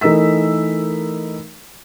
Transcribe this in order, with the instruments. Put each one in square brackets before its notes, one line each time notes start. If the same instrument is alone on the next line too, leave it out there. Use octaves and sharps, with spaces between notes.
[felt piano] E3 A3 D#4 A#4 E6 B6